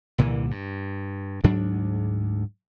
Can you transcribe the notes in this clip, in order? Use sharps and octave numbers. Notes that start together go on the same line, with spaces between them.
C2 A#2 D3 E3
G2
D2 G#2 F#3 D4